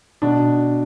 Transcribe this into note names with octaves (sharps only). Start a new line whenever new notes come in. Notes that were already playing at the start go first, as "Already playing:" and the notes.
B2 D4